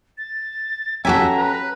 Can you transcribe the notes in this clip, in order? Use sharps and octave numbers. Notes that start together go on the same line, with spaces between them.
A6
C#4 F#4 G4 A4 E5 G#5 A#5
B4